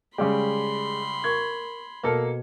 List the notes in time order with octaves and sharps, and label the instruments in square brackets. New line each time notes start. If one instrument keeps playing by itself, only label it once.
[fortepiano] C#3 G3 G4 [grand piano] G#3 [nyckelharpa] B5 C6
[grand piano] A#4 C#6 G#6
[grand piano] B2 [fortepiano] A#3 A4 A#4